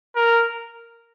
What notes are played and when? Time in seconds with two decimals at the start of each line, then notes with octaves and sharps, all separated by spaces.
0.16 A#4